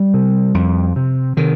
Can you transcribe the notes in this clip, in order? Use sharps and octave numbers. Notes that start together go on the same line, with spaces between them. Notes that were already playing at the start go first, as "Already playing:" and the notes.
Already playing: G3
C3
F2
C3
C3 D#3